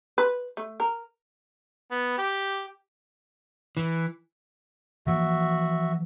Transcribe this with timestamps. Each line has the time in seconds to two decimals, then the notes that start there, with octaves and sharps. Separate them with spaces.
0.18 B4
0.57 A3
0.80 A#4
1.91 B3
2.18 G4
3.77 E3
5.07 E3 F3 A#3 F#4 E5